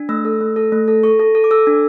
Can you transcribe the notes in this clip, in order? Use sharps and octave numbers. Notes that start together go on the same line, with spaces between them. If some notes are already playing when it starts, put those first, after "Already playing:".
Already playing: D4
A3 E6
A4
A3
A4
A3
A4
A4 C#6
A4
A4
D6
A4 E6
D4